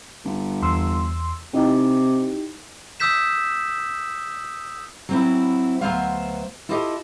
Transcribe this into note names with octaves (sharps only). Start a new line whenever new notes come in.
G1
E2 C6 E6
C3 D#4 E4 G4
D#6 E6 G6 B6 E7
F#3 C4 E4
D2 F#3 B3 C5 E5 F5
E4 F4 G4 A4 D#5